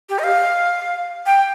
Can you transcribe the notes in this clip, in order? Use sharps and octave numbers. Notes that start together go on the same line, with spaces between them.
G4
D#5
F5
G5